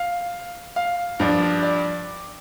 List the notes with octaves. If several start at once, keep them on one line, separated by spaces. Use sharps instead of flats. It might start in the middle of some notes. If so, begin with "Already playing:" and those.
Already playing: F5
F5
G2 F3 D4
D5